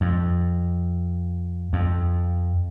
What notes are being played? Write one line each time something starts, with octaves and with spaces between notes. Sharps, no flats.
F2
F2